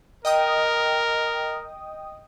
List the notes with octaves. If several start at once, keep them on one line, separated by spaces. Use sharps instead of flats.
A#4 D#5 G5 D#6